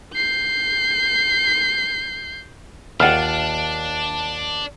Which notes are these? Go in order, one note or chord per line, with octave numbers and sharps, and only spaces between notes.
G6 C7
D#2 D4 F4 F#5 F6